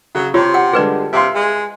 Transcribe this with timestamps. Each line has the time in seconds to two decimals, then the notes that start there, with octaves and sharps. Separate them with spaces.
0.15 C#3 F#3
0.34 C3 F4 G4 C#5
0.54 F#5 G5
0.73 D3 G3 G#3 G#4 B4 D5
1.13 C3 E5 F5 C6
1.35 G#3